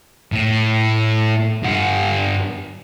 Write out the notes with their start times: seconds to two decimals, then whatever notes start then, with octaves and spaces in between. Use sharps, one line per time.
0.32 A2
1.63 G2 F#5